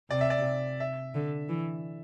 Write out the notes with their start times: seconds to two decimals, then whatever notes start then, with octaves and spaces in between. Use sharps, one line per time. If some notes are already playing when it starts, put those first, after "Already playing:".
0.10 C3 D5
0.21 E5
0.30 D5
0.80 E5
1.15 D3
1.49 E3